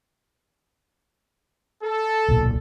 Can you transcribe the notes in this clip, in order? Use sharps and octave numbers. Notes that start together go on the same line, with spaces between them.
A4
D1 B1 A#2